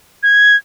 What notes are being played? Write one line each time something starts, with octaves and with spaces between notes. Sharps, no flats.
G#6